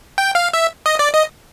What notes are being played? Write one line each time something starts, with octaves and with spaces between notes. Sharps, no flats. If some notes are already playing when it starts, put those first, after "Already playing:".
G5
F5
E5
D#5
D5
D#5